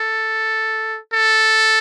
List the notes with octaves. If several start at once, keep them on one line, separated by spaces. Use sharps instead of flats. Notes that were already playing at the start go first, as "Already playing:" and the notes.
Already playing: A4
A4